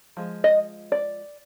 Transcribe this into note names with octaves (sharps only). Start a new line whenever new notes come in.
F3 G#3
D#5
D5